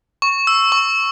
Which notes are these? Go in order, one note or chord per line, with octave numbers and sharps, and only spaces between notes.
C#6
E6
C#6